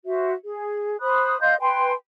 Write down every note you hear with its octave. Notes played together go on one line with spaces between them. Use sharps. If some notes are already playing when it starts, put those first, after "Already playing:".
F#4 C5 E5
G#4
C5 B5 D#6 F#6
D#5 F5 C6 G6
B4 G5 G#5 C6